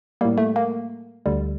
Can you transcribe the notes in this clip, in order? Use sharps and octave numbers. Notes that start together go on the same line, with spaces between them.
A2 G3 A#3
A3
A#3
D2 D3 G3